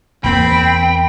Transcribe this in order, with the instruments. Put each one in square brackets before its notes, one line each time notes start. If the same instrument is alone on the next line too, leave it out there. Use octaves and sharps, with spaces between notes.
[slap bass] E2 A#3 [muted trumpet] C4 [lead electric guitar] G5 [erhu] B5